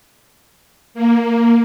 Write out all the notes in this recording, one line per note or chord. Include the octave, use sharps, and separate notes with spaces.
A#3